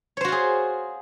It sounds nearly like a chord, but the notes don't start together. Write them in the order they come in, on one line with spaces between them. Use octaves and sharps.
C#5 C5 F#4 F4 G#4